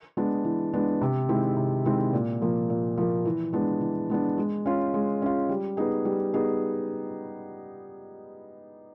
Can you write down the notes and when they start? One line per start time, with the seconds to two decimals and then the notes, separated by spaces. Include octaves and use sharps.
0.17 G#3 B3 D4
0.45 E3
0.74 G#3 B3 D4
1.01 C3
1.29 D#3 G#3 C4 E4
1.57 C3
1.85 D#3 G#3 C4 E4
2.13 A#2
2.42 F3 A#3
2.70 A#2
2.98 F3 A#3
3.25 E3
3.53 G#3 B3 D4
3.81 E3
4.10 G#3 B3 D4
4.38 G#3
4.66 C#4 F4
4.94 G#3
5.22 C#4 F4
5.49 G3
5.77 B3 D#4 G#4
6.05 G3
6.34 B3 D#4 G#4